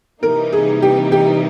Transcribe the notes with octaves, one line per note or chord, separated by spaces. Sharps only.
C3 E3 G3 A#3 D#4 A#4
G#4
G4
G4